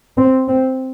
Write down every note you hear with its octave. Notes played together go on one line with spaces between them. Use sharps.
C4
C4